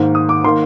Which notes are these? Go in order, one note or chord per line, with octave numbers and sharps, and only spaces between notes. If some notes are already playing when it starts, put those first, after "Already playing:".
Already playing: G#2 D#3 A#3
D#6
D6
D#3 A#3 C6